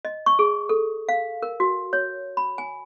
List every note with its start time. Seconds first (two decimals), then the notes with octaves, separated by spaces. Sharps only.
0.05 D#5
0.26 C#6
0.39 G#4
0.69 A4
1.09 F5
1.42 A#4
1.60 F#4
1.93 C#5
2.37 B5
2.58 G#5